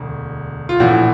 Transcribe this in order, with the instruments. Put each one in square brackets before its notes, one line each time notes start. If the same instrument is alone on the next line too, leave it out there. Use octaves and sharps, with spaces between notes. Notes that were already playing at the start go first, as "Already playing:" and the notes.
Already playing: [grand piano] E1 D2
F4
A#1 A2 E3 F#4